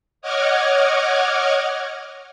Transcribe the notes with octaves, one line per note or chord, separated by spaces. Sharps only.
C#5 D#5 F#5 D6 F6 G#6